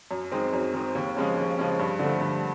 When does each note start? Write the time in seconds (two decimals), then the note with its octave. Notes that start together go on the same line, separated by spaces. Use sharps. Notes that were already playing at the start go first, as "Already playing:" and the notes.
0.11 F#2
0.32 D#3 G#3 C4
0.53 F#2
0.74 D#3 G#3 C4
0.95 D#2
1.16 C#3 F3 G#3 C#4
1.36 D#2
1.58 C#3 F3 G#3 C#4
1.79 G2
2.00 D3 F3 A3
2.21 G2